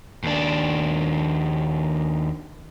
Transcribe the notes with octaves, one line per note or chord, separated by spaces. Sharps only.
D#2 D4